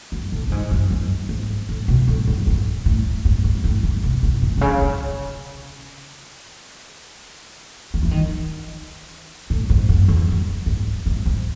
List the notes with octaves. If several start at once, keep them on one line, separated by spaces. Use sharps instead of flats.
F#2
A2
A2
G#2
F#2
F#2
G#2
A2
B2
A2
F#2
G#2
A2
G#2
G#2
A2
A2
B2
B2
A2
B2
C#3
C#3
D#3
E3
D#3
A2
G#2
F#2
E2
F#2
G#2
G#2
G#2